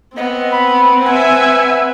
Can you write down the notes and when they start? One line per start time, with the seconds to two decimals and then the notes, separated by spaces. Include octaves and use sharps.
0.17 B3 C4 D#5
0.51 B5
1.05 B4 E5 F#5 G#5